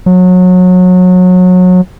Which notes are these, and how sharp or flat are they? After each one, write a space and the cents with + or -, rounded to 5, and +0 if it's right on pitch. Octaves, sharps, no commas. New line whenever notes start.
F#3 -25